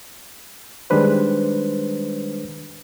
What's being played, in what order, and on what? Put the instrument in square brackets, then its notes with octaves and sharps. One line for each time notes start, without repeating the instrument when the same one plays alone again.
[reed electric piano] D#3 G3 G#3 D4 B4 C5